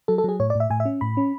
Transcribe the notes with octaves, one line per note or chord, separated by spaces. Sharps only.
F#3 A4
A4
F#3 G#4
A2 C#5
D5
A2 E5
A2 G#5
E5
C#4
A2 B5
C#4